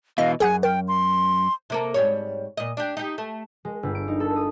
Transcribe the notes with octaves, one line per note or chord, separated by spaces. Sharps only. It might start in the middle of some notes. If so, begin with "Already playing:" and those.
B2 E3 D#5 F5
C2 F#2 G#4 F#5 G#5 F#6
A#4 G5
C6
C3 A#3 A4
G#2 G3 C#5
A#2 D#5
D4 G4
D#4 G4
A3
G#3
G1
D7
D#4
A4
D#6